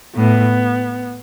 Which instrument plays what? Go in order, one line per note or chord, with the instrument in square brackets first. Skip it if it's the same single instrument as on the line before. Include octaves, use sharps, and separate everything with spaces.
[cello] A2 [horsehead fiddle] B3